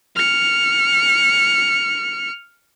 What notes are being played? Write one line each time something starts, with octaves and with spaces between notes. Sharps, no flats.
F6 C#7